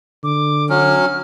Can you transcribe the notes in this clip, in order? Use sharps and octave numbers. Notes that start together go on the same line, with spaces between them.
D3 D6
F#3 C#4 F6